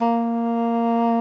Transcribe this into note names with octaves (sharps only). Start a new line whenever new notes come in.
A#3